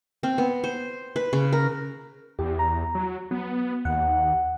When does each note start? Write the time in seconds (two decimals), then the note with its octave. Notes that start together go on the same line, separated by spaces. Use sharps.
0.23 C4
0.38 B3
0.64 C5
1.16 B4
1.33 C#3
1.53 A#4
2.39 E2 G4
2.59 A#5
2.95 F#3
3.31 F#3 B3
3.85 D#2 F#5